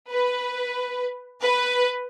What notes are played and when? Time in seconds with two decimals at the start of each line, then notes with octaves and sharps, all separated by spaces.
0.11 B4
1.42 B4